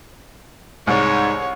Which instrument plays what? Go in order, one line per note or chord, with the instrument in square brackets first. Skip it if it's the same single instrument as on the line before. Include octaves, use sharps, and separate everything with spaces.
[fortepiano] C2 [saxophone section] G#2 [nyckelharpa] C#5